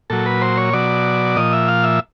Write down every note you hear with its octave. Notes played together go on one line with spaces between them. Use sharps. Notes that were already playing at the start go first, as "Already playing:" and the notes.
A#2 F#3 A4
B4
C5
C#5
B2 F#3 D5
A#2 F3 D#5
E5
F5
E5